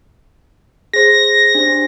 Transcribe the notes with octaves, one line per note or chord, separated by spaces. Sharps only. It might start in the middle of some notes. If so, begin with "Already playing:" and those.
G#4 C5 A#6
D4 G4 C5